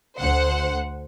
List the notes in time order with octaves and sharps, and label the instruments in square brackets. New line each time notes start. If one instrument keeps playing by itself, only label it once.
[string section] D2 C5 F#5